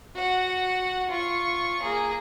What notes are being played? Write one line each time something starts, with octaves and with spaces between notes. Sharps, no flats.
F#4 F#5
F4 C#6
A#3 G#4